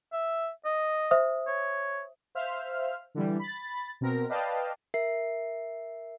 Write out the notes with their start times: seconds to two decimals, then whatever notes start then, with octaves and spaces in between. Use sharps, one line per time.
0.13 E5
0.65 D#5
1.11 C5 E5 D#6
1.47 C#5
2.35 C5 E5 F5 F6
3.15 D3 E3 G3
3.39 B5 A6
4.01 B2 C4 A#4 A#6
4.29 B4 D5 D#5 F5 G5 A5
4.94 A#4 E5 C7